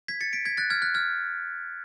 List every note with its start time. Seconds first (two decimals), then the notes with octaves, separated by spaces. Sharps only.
0.08 G#6 B6
0.21 A6 C#7
0.33 B6 D7
0.45 G#6 B6
0.57 F#6 A6
0.70 F6 G#6
0.82 F#6
0.94 F6 G#6